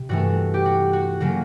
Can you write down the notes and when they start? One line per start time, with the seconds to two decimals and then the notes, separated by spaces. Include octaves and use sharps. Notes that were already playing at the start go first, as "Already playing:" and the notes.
Already playing: C3
0.09 G2 E3 A3 F#4
0.54 G4
0.66 F#4
0.93 F#4
1.20 C#3 F#3 A#3 F#4